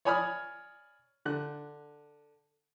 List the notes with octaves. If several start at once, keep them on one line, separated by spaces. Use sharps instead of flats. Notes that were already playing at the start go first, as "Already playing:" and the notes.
C#5 D5 G#5 B5 D#6 F6
D3 F#6